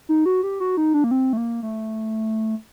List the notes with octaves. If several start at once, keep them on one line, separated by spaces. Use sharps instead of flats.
D#4
F#4
G4
F#4
D#4
D4
A#3
C4
A3
A#3
A3